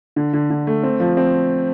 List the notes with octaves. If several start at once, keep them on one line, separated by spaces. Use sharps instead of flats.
D3
D3
D3
A3
C4
F3
C4